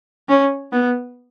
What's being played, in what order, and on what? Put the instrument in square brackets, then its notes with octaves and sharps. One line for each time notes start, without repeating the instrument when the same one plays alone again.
[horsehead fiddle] C#4
B3